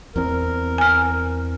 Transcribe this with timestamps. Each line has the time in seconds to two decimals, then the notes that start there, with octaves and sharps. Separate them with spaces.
0.16 E2 E3 C4 A#4
0.78 G#5 F6